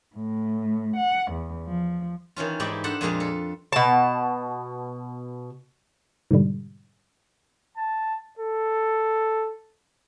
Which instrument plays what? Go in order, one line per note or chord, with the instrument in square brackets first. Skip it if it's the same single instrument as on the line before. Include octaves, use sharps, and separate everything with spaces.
[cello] A2
F#5
E2
F3
[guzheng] D#3 E3 C#4 F4
G#2 G#3 E4 G4 D5
D4 A4 C5 F#5 A5
F2 A#2 G#3 F4 G#4 F5
A4
[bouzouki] B2 A5
[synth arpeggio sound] G#2 B2 D3 G3
[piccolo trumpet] A5
A4